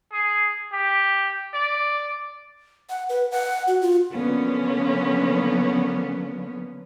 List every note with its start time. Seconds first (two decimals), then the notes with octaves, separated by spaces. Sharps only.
0.12 G#4
0.73 G4
1.53 D5
2.89 F#5
3.09 B4
3.31 F#5
3.68 F#4
3.81 F4
4.12 D3 F3 F#3 A#3 B3 C#4